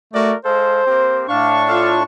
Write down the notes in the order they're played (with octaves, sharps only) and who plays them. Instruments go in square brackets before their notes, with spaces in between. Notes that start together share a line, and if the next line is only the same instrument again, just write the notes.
[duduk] A3 [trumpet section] F#4 A#4 D5
[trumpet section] G#3 A4 F5 [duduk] C5
[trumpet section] A#3 C4 G4
[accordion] A2 D4 C#6 [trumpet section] F5
[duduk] F4 [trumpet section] A4 F5